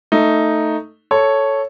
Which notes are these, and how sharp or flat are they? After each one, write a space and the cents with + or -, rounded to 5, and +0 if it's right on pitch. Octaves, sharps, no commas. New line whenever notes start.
A3 +10 D#4 +0
A4 +0 C#5 +0